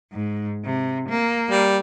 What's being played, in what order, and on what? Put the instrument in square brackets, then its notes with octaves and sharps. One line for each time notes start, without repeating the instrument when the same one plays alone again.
[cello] G#2
C3
A#3
[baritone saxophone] G3